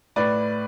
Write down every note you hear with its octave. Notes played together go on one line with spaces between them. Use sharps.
A2 B4 D5